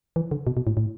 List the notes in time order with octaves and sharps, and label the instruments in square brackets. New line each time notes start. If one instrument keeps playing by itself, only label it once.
[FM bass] E3
D3
B2
B2
A2
A2